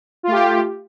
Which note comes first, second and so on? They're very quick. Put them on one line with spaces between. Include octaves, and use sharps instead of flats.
F4 A3 G4